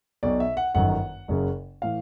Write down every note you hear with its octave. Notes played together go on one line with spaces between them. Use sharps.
B1 B2 D5
E5
F#5
G1 F#2 D#3 F#5
F#1 F#2 C#3
A2 E3 F5